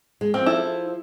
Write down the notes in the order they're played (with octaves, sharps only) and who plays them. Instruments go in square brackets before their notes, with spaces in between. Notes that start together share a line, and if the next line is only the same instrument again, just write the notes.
[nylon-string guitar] G#3
[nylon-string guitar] F3 [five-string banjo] C4
[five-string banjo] E4 A4